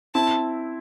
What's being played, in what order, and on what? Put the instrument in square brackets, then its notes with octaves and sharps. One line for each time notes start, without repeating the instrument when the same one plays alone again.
[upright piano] C4 E4 [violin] A5